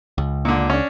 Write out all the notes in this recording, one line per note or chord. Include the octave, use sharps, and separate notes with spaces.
C#2
A#2 D3
C#4 D4